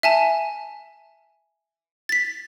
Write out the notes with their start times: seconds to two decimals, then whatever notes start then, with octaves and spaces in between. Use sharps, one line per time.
0.03 E5 G#5 A5
2.09 A6 B6